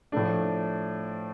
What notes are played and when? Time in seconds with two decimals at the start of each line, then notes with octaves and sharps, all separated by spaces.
0.12 A2 F3 A3 D4